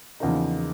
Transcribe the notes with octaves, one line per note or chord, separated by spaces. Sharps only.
E2 C#3 F3 A#3 D#4